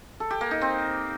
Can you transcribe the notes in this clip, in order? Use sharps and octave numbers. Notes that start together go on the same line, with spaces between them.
A4
G4
A#3
D#4
C4